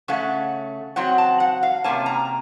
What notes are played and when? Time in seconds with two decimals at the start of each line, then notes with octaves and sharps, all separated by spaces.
0.08 C#3 A3 C#4 F#5
0.96 C#3 F#3 C4 F#5
1.18 A5
1.40 F#5
1.63 F5
1.84 C3 D#3 A#3 C#4 A5
2.06 A#5